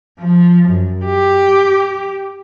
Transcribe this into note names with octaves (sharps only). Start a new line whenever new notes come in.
F3
F#2
G4